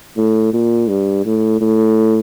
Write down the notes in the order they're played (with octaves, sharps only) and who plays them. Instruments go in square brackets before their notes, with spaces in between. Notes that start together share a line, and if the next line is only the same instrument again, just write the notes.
[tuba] A2
A#2
G2
A2
A2